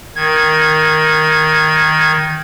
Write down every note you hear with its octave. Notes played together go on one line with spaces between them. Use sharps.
D#3 G#6